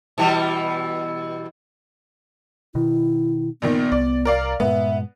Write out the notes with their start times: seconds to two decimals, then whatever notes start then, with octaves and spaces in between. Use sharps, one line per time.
0.18 B2 E3 G3
2.75 B2 D#3 E4
3.62 A#1 A#2 D#3 B3
3.92 C2 D5
4.25 A#4 D5 F5
4.60 G2 A#2 G#3 B3 E5